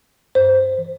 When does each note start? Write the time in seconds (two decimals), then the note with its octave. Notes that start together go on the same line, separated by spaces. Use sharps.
0.35 G2 C5
0.78 E3